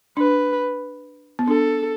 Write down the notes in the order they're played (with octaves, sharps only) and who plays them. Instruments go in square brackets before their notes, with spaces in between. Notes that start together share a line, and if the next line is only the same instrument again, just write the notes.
[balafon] D4 [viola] B4
[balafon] B3
[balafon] D4 [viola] A4